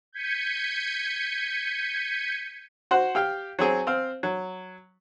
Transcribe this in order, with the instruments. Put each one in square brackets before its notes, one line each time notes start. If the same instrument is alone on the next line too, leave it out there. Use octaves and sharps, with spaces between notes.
[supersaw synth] G6 G#6 B6 C#7 D#7
[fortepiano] F#4 C5 F#5
G4 F5 G5
F#3 C4 G#4
C4 F5
F#3